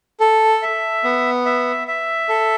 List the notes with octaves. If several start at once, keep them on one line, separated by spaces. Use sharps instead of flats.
A4
E5
B3
E5
E5
A4